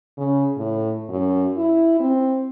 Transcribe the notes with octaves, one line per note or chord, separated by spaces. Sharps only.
C#3
A2
F#2
E4
C4